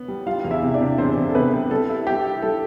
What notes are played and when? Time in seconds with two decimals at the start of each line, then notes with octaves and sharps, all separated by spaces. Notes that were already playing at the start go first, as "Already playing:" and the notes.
Already playing: B3
0.08 G3
0.26 G3 F4 F5
0.44 E2
0.50 E4 E5
0.63 C3
0.74 D4 D5
0.81 C3
0.98 E2 C4 C5
1.17 E2
1.29 A4
1.35 C3 B3 B4
1.53 G3
1.71 G3 A4
1.89 E4
2.07 G3 G4
2.25 E4
2.42 G3 A4